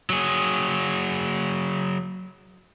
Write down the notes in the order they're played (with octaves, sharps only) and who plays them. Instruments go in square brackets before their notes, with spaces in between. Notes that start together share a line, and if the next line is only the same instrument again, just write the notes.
[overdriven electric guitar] F#3 G#4